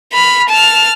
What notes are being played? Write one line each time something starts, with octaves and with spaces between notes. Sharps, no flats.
B5 F6
A5 F6